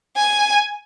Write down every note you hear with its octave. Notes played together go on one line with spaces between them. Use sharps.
G#5